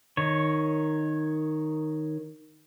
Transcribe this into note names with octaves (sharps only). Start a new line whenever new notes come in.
D#3 C#5